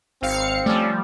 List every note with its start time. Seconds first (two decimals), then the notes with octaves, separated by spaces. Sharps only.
0.22 G#1 C4 F5 C#7
0.66 F3 G3 A3 C#4 A4 D5